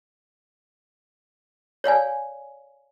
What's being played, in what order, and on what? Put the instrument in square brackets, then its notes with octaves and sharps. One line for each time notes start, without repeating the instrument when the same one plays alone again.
[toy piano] C#5 D5 F5 G#5